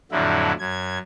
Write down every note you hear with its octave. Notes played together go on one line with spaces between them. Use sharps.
F2 A2 D3 F3 F#3 E4
F#2 G#6